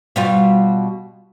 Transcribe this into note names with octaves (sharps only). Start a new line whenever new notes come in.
B2 G3 F4